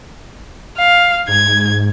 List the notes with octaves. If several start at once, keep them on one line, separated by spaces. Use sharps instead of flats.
F5
G#2 G#6